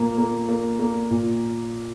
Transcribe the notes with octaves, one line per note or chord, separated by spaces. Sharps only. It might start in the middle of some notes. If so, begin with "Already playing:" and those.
Already playing: A#2 A#3
A#3
A#3
A#3
A#2